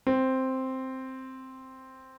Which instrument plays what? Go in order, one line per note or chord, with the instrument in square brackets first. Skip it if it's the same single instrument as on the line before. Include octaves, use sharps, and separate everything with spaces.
[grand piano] C4